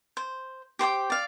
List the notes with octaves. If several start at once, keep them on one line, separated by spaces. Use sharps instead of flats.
C5
G4 C5 G5 D6
D5 F5